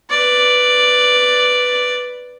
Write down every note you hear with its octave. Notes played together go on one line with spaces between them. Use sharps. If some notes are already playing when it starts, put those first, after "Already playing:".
B4 D5